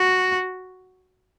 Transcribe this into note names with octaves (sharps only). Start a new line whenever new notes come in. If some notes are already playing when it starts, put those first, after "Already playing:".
Already playing: F#4